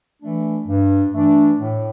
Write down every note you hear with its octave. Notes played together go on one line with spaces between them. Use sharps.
E3 A3 D4
G2
E3 A3 D4
A2